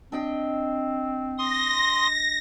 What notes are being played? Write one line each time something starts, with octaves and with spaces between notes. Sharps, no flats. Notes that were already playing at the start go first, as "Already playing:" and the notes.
C4 D4 D#5 G5
C6 D#6 A#6